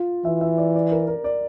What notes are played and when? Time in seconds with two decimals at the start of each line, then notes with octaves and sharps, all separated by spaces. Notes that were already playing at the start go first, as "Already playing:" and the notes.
Already playing: F4
0.25 E3 E5
0.41 E5
0.58 D5
0.75 D5
0.92 A#4
1.08 A#4
1.24 D5